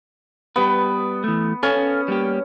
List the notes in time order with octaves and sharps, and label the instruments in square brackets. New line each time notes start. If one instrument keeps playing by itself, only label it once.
[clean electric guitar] G3 G4 B4 [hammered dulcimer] B3
[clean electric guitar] E3 A3
[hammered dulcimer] C#4 [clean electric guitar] A4 F5 G#5
[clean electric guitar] G3 A#3 G4